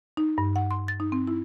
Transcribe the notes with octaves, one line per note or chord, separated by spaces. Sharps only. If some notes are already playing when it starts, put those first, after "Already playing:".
D#4
G2
F#5
C6
A6
D#4
C4
E4